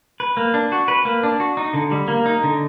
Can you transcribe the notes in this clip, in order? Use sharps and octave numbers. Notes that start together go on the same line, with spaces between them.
B4
A#3
D4
F#4
B4
A#3
D4
F#4
D#4
D3
G3
A#3
D#4
D3